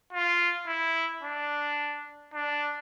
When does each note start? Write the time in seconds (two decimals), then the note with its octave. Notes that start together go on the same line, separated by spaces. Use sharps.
0.13 F4
0.67 E4
1.23 D4
2.34 D4